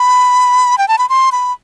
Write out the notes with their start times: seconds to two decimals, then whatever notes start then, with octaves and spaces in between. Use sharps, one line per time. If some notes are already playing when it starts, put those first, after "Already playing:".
Already playing: B5
0.78 G5
0.88 A5
0.98 B5
1.09 C6
1.32 B5